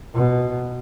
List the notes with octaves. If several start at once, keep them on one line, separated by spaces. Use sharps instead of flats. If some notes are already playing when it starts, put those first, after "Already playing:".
B2